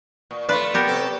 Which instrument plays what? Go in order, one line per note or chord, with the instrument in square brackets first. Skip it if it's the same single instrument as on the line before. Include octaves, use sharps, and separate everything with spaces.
[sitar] A#2
[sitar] A3 D5 [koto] F4 B4
[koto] B3 G4 A#4
[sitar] C3 A4